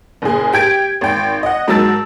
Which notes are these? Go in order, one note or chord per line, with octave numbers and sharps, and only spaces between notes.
F#1 A#2 G#4
G4 G5 G#6 D7
G#1 G5
D#5 F#5
G#2 F#3 A#4 A5 E6 A6